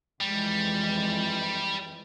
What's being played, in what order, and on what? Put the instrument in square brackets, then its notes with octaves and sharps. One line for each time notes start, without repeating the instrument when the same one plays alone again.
[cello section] F2 E3 G#3 [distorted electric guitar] G3